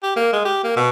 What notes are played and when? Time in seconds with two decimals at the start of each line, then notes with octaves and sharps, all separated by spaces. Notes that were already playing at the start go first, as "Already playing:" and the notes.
0.03 G4
0.16 A#3
0.33 G#3
0.45 G4
0.64 A#3
0.76 B2